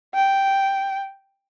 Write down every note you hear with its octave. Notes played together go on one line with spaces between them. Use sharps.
G5